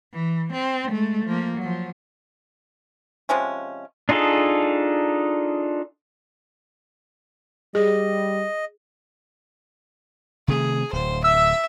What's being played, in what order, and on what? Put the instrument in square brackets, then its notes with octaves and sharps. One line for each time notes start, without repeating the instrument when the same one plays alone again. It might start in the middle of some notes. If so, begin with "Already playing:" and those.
[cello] E3
C4
G#3 A3
F3 A#3
F3 F#3
[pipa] C3 F3 G#3 C#4
[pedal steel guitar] D4 D#4 F4 G#4 A4
[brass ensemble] G3 [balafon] G#4 [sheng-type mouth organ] D#5
[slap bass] C3 D#3 A3 [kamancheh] G#4
[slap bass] D1 [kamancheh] C5
[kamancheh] E5 [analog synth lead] E6